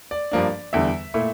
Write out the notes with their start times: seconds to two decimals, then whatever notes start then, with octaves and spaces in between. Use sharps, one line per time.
0.11 D5
0.32 G2 F3 A#3 D4
0.73 E2 D3 G3 E5
1.14 A#2 A3 E4